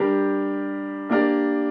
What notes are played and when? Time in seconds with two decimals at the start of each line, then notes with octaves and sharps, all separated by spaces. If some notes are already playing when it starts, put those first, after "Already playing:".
Already playing: G3 D4 G4 A#4
1.10 A#3 D4 G4 A#4 D5